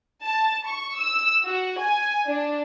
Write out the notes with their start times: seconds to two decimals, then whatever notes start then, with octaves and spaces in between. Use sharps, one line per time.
0.23 A5
0.67 C#6
0.98 E6
1.44 F#4
1.80 G#5
2.28 D4